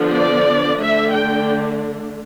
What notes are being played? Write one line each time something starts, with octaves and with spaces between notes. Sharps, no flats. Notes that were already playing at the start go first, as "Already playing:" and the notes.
Already playing: D3 F3 B3 D4
D5
D3 A3 D4 E5
G5